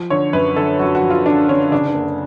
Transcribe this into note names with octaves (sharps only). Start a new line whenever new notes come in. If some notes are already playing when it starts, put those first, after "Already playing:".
Already playing: F3
D3 C#5
F#2 B4
D3 A4
F#2 F#4
F#4
F3
F4
D3 D4
D3 C#4
C#3 D4
D4
F#1